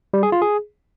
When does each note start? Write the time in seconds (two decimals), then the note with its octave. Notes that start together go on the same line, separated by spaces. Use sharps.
0.14 G3
0.23 G#4
0.32 F4
0.42 G#4